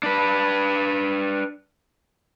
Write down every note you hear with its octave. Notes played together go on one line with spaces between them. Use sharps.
D4 B4